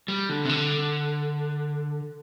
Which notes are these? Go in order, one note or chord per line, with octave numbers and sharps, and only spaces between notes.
G3
D3
C3
D3